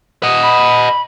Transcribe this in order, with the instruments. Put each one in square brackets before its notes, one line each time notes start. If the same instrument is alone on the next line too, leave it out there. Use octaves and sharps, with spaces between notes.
[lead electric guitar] D#5 F#5
[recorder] B5